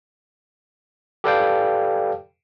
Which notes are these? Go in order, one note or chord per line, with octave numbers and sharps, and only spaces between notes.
G4 A4 B4 D5 F5 G5